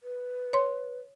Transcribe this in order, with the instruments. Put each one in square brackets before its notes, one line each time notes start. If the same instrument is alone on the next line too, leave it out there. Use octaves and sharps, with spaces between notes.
[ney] B4
[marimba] C#5 C6